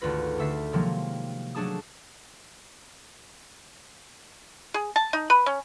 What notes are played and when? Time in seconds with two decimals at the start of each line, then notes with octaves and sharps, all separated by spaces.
0.01 G#1 D2 F4 B4 A#6
0.38 D3 A3 E5 B6 C7
0.73 C3 D#3 F3 F#3 G#3 A#3
1.55 F#3 A3 D4 G#4 A5 D#6
4.74 G#4
4.96 A5
5.13 D#4
5.30 B4
5.46 C#4